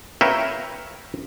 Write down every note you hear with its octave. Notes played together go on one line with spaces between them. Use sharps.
A#4 B4 C#5 E5 F5 G5